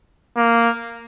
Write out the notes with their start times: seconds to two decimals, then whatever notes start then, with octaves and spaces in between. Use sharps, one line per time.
0.37 A#3